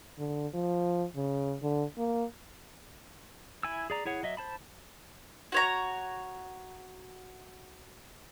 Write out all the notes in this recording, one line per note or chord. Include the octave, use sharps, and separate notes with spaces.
D3
F3
C#3
D3
A#3
E4 G#5 E6
G#4 D5 A#5
E4 G#4 C#5 F#5
F#3 D#5 E5
C5 A5 B5
F#4 C#5 A#5